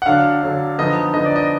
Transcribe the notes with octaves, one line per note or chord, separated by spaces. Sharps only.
F#5
D3 F#3 D4 F5
D3 F#3 D4
D3 F3 B3 D#4 D#5
D3 F3 B3 D#4 D#5
D5
D#5